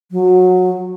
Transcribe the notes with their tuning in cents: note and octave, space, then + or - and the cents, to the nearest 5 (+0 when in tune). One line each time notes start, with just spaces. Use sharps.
F#3 -20